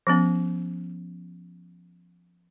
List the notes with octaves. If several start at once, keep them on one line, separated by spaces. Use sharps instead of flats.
F3 B3 C#4